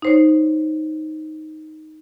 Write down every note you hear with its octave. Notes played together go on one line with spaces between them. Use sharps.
D#4 C5 C#5